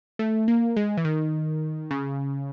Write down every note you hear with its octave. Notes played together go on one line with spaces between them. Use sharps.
A3
A#3
G#3
E3
D#3
C#3